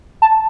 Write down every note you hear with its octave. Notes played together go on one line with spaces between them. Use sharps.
A5